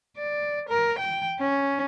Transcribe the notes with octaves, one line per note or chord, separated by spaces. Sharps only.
D5
A#4
G5
C#4